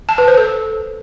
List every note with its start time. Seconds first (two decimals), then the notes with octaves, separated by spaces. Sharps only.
0.09 A5
0.18 B4
0.28 C5
0.37 A4